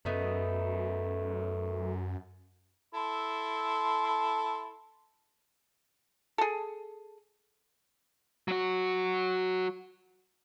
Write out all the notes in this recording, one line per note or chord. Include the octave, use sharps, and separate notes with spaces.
F#2 A3 B3 D#4
E4 A4 C6
G#4 A4
F#3 F#4